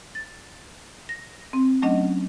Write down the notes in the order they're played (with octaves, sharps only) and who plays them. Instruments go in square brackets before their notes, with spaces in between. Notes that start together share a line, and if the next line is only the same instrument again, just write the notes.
[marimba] A6
A#6
C4
F#3 A3 C#4 D4 D#5 F#5